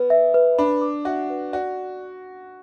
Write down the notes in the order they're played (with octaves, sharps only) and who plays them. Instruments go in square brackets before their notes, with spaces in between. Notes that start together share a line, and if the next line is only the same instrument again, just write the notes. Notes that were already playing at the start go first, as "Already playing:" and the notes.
Already playing: [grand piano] B3 [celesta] B4
[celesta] E5
B4
[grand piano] D4 [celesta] B5
[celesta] D6
[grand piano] F#4 [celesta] E5
[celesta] B4
[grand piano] F#4 [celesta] D5